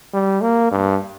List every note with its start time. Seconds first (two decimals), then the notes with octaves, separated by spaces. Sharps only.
0.14 G3
0.41 A#3
0.71 G2